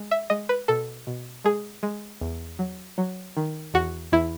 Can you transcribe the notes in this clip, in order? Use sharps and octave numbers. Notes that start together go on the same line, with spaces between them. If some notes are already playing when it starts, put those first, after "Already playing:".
Already playing: G#3
E5
G#3 D#5
B4
B2 A4
B2
G#3 G#4
G#3
E2
F#3
F#3
D#3
E2 F#4
E2 E4